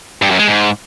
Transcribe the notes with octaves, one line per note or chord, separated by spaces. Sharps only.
G2
F#2
G#3
G#2